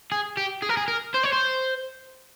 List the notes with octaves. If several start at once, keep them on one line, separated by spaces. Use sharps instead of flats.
G#4
G4
G#4
A#4
G#4
A#4
C5
C#5
C5